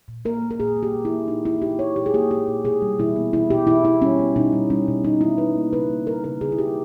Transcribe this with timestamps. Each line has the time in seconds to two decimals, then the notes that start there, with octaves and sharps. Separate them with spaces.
0.08 A#2
0.25 A#3 A#4
0.42 A#3
0.51 A#4
0.59 A#2 G#4
0.76 A#3
0.83 G4
0.94 A#2
1.05 E4
1.11 A#3
1.28 A#2 D#4
1.45 A#3 E4
1.62 A#2 G4
1.79 A#2 C#5
1.96 A#2 G4
2.06 G#4
2.14 A#3 G4
2.31 A#2 G4
2.48 A#2
2.64 B2 G#4
2.82 G3
2.99 B2 E4
3.16 B3
3.33 B2 E4
3.50 B2 G4
3.67 B2 E4
3.84 B2 E4
4.01 G3 C#4
4.19 B3
4.36 B2 D#4
4.53 G3
4.70 G3 C#4
4.88 B2
5.04 G3 D#4
5.21 G3 E4
5.38 G3 B4
5.56 A#3
5.73 C#3 B4
5.90 A#3
6.07 G3 A#4
6.24 C#3 A#4
6.41 C#3 G#4
6.52 E4
6.58 C#3 G4